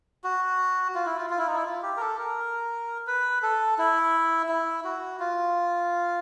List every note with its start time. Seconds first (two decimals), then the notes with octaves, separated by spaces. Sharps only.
0.24 F#4
0.95 F4
1.06 E4
1.17 F4
1.30 F4
1.39 E4
1.47 D#4
1.56 E4
1.65 F4
1.83 G4
1.97 A#4
2.01 A4
2.18 A#4
3.07 B4
3.42 A4
3.78 E4
4.49 E4
4.85 F#4
5.20 F4